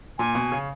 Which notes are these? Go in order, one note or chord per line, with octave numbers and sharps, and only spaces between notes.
A#2 G#5
B2
C#3